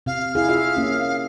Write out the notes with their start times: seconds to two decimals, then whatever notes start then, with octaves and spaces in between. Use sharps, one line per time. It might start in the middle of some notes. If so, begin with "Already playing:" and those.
0.06 C3 F5
0.35 E4 G#4 F5
0.49 F4 G#4 E5
0.77 A#3 C#4